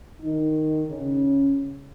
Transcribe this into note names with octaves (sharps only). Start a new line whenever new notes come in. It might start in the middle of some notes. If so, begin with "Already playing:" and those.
D#3 D#4
C#3 C#4